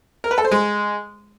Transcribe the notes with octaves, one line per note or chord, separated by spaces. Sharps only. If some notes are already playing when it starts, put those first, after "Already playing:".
A#4
B4
A4
C5
G#3